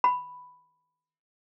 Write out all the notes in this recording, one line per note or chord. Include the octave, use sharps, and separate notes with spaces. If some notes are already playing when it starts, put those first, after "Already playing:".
B5